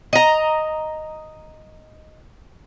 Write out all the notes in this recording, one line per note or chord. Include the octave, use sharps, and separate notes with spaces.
D#5 A#5